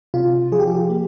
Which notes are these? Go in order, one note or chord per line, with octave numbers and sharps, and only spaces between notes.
C3 F4
F3 G#4
G4
F4
G4
A#3